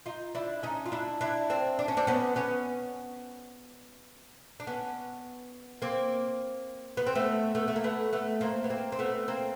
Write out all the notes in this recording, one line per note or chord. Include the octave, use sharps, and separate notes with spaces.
D#4 F4
D4 E4
C#4 D#4
F4
D4 E4
D4 E4
C4 D4
D4
C#4
C4 D4
B3 C#4
B3 C#4
D4
B3 C#4
A#3 C4
B3
C4
A3 B3
A3 B3
A3
A#3
A3 B3
A3 B3
A#3 C4
B3
A#3 C4
C4
A3 B3
A#3 C4